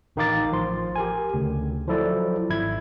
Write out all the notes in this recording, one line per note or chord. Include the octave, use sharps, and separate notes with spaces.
A1 D#3 D#4 F5 D6 A6
A1 F3 C6
G4 A#4 G#5
D2 C#3
F3 F#3 E4 A4 D5
G#1 E4 G#6